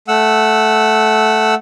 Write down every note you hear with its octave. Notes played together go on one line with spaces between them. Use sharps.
A3 F#5 E6